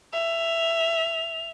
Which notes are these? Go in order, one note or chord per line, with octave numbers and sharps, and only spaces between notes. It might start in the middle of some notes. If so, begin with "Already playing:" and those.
E5 F7